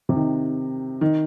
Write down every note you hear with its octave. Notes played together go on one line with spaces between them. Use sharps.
C3
D#3
D#3